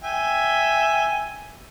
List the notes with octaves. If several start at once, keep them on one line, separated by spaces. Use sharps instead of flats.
E5 G5 G#5